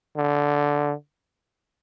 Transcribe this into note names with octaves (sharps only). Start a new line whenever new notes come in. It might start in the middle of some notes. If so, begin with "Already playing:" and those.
D3